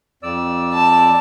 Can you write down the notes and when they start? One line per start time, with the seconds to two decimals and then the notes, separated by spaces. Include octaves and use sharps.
0.23 F2 D5 E6
0.73 A5